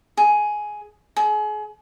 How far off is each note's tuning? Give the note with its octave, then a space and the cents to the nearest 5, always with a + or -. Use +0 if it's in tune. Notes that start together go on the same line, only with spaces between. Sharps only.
G#4 +10
G#4 +35